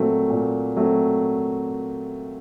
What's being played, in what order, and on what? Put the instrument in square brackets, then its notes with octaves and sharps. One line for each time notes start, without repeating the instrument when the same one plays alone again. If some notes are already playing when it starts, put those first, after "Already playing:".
Already playing: [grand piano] A#2 F#3 A3 C4
A#2
F#3 A3 C4